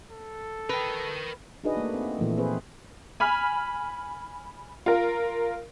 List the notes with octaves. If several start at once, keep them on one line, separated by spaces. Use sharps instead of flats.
A4
A#4 B4 G5
D4 D#4 F#4 G#4 B4 D#5
A3 A#3
C4
A#2 E3 F3 A3
C4 G#4 B4 C5
G#5 B5 F6 B6
F4 A#4